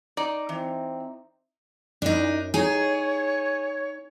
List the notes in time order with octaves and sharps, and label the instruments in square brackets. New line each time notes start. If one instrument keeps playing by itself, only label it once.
[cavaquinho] D#4 [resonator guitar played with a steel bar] D5
[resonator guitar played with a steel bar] E3 [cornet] C4
[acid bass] F#2 [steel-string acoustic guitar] D4 D#4
[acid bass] D#4 [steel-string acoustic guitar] G#4 [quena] C#5